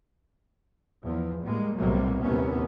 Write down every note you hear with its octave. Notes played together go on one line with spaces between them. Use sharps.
E2 F3
A2 G3 G#3 A#3
B1 A2 C3 F#3 G3 A#3
D#2 A2 C3 B3 C#4